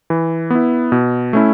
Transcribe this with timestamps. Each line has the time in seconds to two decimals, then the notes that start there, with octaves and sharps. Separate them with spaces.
0.10 E3
0.50 B3 E4
0.92 B2
1.33 A3 C#4 E4